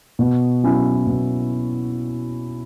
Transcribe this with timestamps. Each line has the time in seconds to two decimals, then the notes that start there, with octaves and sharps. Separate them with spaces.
0.19 B2
0.64 F#3 C#4 E4
1.07 B2